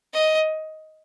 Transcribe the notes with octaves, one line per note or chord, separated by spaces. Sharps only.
D#5